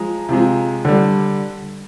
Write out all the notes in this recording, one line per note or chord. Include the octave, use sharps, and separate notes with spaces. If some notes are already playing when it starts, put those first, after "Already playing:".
Already playing: F3 G#3 A#5
C3 F3 G#3
D3 G3